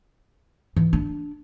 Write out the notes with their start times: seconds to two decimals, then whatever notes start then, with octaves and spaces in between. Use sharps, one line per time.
0.76 E3
0.93 D4